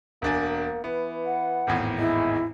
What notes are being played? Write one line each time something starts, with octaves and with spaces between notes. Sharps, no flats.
E1 A#3 D4 G#5
E3 B3
F#5
G#1 E2 A2
G#3 E4